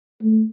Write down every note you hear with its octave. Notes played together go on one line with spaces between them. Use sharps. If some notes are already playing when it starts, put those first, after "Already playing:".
A3